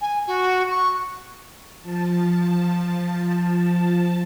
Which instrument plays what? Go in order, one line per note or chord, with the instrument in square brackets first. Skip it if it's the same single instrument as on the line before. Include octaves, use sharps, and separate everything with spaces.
[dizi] G#5
F#4
C#6
[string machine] F3 A5